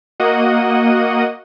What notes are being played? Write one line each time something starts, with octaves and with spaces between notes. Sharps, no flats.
A#3 F#4 D#5 F#5 D#7